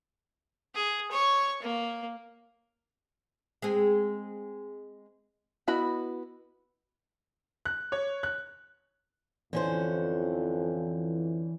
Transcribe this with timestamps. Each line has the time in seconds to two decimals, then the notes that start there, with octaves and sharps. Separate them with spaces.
0.75 G#4
1.11 C#5 C#6
1.62 A#3
3.62 G#3 C4 G#4
5.67 B3 E4 F#4 D#5 B5
7.65 F#6
7.92 C#5
8.23 F#6
9.53 F2 D3 E3 C#4 C5